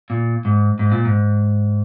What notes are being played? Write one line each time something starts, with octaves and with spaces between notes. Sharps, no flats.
A#2
G#2
G#2
A#2
G#2